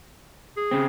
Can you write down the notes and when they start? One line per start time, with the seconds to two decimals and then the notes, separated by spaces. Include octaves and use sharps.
0.57 G#4
0.71 C#3 C4